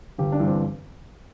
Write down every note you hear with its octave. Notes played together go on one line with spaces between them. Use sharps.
G1 G4
D4
G2 E3
C4